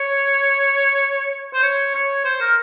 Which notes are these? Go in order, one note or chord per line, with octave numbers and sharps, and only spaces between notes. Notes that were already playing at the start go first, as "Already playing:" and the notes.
Already playing: C#5
C5
C#5
C#5
C5
A#4